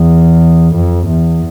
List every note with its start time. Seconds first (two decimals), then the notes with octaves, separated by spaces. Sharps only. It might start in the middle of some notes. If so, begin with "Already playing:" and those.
Already playing: E2
0.75 F2
1.08 E2